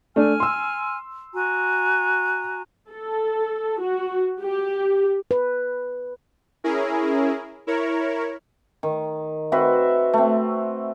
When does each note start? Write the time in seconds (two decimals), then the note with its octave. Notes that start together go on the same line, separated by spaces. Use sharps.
0.16 A3 D4 G#5 F6
0.40 C6 E6
1.34 F#4 G#5 A#5
2.91 A4
3.80 F#4
4.42 G4
5.31 B4
6.64 C#4 E4 G#4 A#4
7.67 E4 A#4 C#5
8.83 D#3
9.52 C4 F#4 B4 E5
10.13 A3 C4